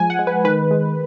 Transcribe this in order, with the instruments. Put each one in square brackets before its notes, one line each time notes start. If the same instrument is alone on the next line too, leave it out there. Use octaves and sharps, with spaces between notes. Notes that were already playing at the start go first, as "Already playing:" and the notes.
Already playing: [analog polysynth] F3 G#3 G#5
F#5
G#3
B4
D#3 B4
G#3